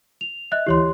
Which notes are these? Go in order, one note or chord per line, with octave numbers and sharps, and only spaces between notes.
F7
D#5 E5 F#6
D2 E3 E4 G4 C#5 C6